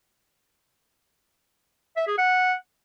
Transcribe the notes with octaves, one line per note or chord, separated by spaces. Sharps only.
E5
G#4
F#5